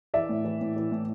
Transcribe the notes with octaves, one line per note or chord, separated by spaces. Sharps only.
E3 D5 E5
A2
E3
A2
E3
A2